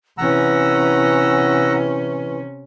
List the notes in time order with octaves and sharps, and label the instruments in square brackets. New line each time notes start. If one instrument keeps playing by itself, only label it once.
[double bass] C3 C#4 [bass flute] E3 [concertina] F#5 A#5 E6